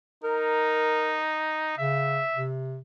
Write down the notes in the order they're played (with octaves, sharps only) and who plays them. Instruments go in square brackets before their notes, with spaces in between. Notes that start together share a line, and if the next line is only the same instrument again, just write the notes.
[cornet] D#4 [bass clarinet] A#4
[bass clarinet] C#3 [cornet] E5
[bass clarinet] C3